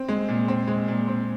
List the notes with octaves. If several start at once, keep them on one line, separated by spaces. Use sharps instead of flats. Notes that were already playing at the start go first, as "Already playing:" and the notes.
Already playing: C4
G#3
A#2
C4
G#3
A#2
C4